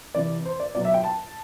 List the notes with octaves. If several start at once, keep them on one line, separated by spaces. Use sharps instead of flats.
C3 E3 D5
C5
D5
B2 F#3 D5
E5
G5
A5